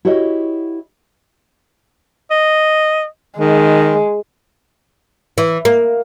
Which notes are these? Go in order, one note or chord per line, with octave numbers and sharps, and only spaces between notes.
E4 F#4 G4 C#5 D#5 E5
D#5
D#3 G#3
E3
A#3